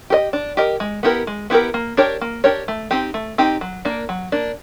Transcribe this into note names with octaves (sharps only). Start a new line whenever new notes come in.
G4 A#4 D#5
D4
G4 A#4 D#5
G#3
B3 E4 G4 A#4
G#3
B3 E4 G4 A#4
A#3
D4 G4 A#4 C#5
A#3
D4 G4 A#4 C#5
A3
C4 D#4 G4
A3
C4 D#4 G4
F#3
A#3 D4
F#3
A#3 D4